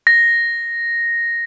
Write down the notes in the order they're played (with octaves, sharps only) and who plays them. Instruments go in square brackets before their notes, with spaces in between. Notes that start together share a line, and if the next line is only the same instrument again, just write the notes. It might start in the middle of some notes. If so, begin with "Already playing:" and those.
[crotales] A#6